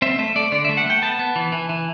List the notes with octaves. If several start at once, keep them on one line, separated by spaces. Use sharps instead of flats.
C4 E5
A3 E5
A3 D5
D3 D5
A3 E5
F#5
A3 G5
B3 A5
B3
E3
E3
E3